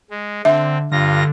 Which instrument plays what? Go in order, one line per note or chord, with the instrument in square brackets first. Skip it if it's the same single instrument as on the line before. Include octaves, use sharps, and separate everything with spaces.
[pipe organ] G#3
[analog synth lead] D3 [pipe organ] C4 [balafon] E5
[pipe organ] G2 F4 A#6 [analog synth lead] D3